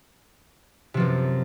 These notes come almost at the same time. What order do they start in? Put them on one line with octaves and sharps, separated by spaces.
C3 F3 F#2